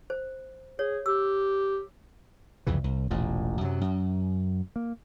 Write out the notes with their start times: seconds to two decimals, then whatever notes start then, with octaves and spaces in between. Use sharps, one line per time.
0.10 C5
0.79 G#4 C#5
1.06 G4 E6
2.67 C2 F2 C#3 E3
2.84 C2
3.10 E1 A1 A#2
3.61 F#2 C3 F#3
3.81 F#2
4.76 A#3